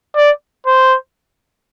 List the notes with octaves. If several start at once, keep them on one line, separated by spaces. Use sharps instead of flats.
D5
C5